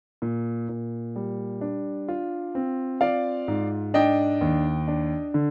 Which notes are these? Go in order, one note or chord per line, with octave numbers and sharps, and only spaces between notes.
A#2
A#2
G3
D4
F4
C4
F4 D5 F5
G#2
D4 D#5 G5
D#2
D4
D3